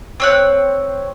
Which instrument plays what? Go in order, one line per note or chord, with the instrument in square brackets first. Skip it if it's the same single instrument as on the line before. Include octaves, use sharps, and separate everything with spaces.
[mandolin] C4 C#5 F#6